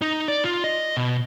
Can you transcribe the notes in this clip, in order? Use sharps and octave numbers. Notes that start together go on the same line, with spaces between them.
D#4
D5
F4
D#5
B2